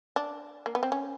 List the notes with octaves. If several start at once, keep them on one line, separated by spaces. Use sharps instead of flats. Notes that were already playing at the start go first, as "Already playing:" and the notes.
D4
A#3
B3
C4
C#4